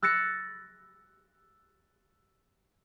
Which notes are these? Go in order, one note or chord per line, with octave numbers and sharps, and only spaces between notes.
E6 F#6 A6 A#6 C#7 E7